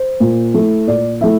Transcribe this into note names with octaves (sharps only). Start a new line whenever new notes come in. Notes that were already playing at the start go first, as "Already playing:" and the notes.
Already playing: C5
A#2
A3 E4
A#2 D5
A3 E4 E5